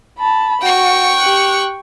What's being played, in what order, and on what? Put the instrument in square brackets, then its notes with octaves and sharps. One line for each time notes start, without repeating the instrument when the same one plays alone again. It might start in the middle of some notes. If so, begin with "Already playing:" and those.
[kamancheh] A5 B5
[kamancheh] F#4 [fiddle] G5 C#6
[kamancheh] G4 F#6